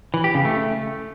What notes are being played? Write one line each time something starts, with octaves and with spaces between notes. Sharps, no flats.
E3
G4
C#3
A3